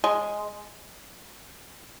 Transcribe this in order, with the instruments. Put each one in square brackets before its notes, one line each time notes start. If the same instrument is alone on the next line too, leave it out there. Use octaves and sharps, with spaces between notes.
[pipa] G#3